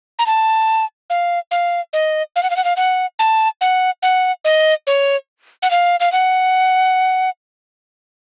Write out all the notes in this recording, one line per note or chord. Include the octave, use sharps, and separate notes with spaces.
A#5
A5
F5
F5
D#5
F5
F#5
F5
F#5
F5
F#5
A5
F#5
F#5
D#5
C#5
F#5
F5
F5
F#5